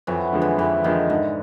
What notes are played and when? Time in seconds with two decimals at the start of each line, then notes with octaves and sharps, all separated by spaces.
0.07 F2 E3 F#3
0.33 D3 F3 G#3
0.42 E3
0.58 F2 E3
0.84 D3 D#3 F3 G#3
1.10 G#2 D3